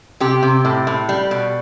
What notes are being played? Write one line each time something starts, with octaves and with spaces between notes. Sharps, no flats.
C3 G4
C3
A2
A2
G3
B2